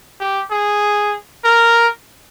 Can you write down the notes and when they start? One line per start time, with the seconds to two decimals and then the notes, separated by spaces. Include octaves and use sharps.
0.20 G4
0.51 G#4
1.44 A#4